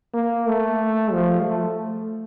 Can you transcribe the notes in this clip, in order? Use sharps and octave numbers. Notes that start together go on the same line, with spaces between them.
A#3
A3
F3
A3